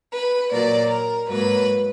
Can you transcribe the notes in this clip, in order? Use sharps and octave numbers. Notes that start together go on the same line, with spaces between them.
B4
A#2 F#3 A#3 D5
A#4
G#2 F#3 A#3 B4